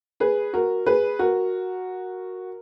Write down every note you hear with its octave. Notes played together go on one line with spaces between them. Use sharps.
G#4 B4
F#4 A#4
G#4 B4
F#4 A#4